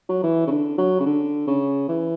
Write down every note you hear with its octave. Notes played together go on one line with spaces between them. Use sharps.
F#3
E3
C#3
D3
F#3
C#3
D3
C#3
E3